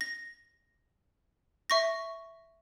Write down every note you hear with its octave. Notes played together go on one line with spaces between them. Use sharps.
A#6
E5 C#6 A#6